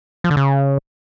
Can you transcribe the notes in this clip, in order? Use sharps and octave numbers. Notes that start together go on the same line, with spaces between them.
F3
D3
C#3